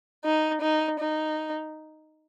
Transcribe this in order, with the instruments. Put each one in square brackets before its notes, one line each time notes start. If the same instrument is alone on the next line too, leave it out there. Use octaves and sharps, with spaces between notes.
[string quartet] D#4
D#4
D#4